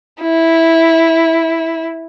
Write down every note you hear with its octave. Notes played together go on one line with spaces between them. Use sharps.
E4